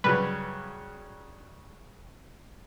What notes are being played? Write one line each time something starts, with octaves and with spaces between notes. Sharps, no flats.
G2 C#3 F#3 B4